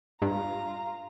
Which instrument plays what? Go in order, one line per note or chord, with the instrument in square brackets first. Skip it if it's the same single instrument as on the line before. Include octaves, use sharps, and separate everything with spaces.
[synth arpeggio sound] G2 [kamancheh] F4 A#5